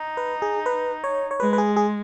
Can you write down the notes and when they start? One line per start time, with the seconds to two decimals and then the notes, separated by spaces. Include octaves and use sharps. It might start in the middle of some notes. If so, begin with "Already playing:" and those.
Already playing: D#4
0.17 B4
0.42 G#4
0.66 B4
1.04 C#5
1.31 C#5
1.40 G#3 B4
1.53 B4
1.58 G#4
1.76 G#4